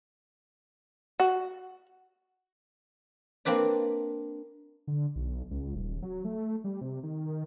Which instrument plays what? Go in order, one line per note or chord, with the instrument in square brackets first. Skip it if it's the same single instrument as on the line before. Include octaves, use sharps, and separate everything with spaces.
[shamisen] F#4
[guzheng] A#3 C4 D4 B4 D5
[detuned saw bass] D3
B1
C#2
D#1
F#3
A3
G3
C3
D#3